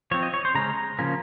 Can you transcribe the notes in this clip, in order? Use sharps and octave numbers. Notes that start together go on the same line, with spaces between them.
F3 C4 C#5
D#5
C#5
C5
C#3 G#3 C#4 A#5
C#3 F3 A#3 C#4